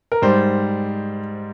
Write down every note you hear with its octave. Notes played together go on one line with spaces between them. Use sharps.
A#4
G#2 G3 C5